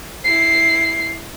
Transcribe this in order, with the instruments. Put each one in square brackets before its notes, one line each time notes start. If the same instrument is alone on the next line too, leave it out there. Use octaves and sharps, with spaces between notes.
[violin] E4 C7